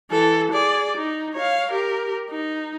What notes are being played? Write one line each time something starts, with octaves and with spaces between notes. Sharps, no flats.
E3 A4
G#4 D5
D#4
C#5 F5
G4 A#4
D#4